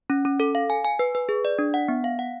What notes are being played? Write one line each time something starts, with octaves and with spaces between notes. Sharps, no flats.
C#4
C#4
A4
F5
G#5
G#5
B4
B4
G#4
D5
D4
F#5
B3
F5
F#5